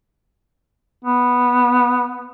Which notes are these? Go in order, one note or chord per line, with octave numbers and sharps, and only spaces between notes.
B3